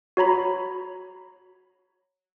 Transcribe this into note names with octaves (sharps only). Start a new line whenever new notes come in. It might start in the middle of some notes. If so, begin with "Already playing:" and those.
F#4 C#5 A#5 B5